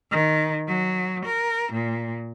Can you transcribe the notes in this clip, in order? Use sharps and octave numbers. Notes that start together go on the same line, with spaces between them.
D#3
F#3
A#4
A#2